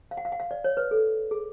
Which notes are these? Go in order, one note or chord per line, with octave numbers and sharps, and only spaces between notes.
F5
F#5
F5
F#5
F5
D5
C#5
B4
A4
G#4